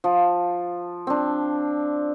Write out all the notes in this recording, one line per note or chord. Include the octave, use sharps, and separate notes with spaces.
F3
C4 D4